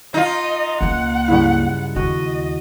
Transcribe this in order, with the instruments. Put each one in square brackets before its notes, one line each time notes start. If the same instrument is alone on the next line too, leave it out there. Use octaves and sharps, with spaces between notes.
[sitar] D#4 F4 [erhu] D#5 [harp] G6
[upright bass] C#2 A#3 [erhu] F#5
[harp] G2 C#3 E4
[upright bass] D#2 C#3 [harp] F#4 [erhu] D#5